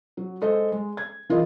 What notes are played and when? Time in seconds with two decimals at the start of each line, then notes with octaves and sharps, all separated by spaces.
0.17 F#3
0.41 G#3 A4 C5 D#5
0.72 G#3
0.97 G#6
1.29 E3 F4 G#4 A#4 D#5